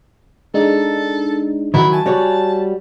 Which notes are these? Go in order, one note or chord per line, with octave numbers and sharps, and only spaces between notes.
G#3 D4 D#4 A4
D#3 F#3 E4
G#5 A5
G3 F#4 C#5